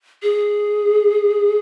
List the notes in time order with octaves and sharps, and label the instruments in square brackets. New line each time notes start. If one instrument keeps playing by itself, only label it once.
[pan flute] G#4